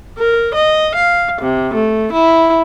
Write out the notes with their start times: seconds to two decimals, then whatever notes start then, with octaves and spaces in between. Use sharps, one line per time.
0.19 A#4
0.55 D#5
0.94 F5
1.40 C3
1.74 A3
2.13 E4